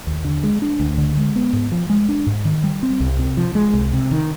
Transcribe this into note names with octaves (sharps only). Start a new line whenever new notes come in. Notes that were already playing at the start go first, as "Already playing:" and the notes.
D#2
D3
G#3
D4
D2
D3
G#3
B3
G#2
F3
G#3
D4
G#2
D#3
G3
C4
C2
C3
F3
G#3
C2
C3
D#3